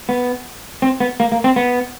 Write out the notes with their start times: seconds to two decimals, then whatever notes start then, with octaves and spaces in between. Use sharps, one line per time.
0.09 B3
0.82 C4
1.00 B3
1.20 A#3
1.32 A#3
1.44 C4
1.56 B3